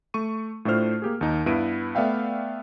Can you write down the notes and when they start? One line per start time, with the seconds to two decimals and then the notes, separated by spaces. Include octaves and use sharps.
0.14 A3 C#6 D#7
0.65 A2 A3 D4 F4 C5 F6
1.02 A#3 G4 G#4
1.21 D#2 D#4
1.46 G2 B3 E4 D7 D#7
1.95 A3 B3 D5 E5 F5 G5